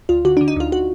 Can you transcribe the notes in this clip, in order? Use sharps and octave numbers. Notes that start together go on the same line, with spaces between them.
D2 F4
D3 F#4
D4
D3
D#4
D2 F4
F#4